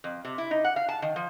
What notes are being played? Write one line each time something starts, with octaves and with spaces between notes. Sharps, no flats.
F2
C3
E4
D#4
F#5
F5
A5
D#3
F3